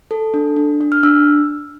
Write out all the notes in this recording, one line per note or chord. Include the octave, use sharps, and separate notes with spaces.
A4
D4
D4
D4
F6
D4 E6